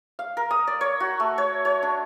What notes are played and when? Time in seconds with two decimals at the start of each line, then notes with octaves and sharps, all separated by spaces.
0.19 F5
0.37 A#4
0.51 D#6
0.67 D5
0.81 C#5
1.00 F#4
1.20 A3
1.38 C#5
1.65 C#5
1.83 D4